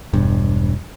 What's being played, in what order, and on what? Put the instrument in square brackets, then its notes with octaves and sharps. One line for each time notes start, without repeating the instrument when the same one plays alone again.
[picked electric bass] E1 G2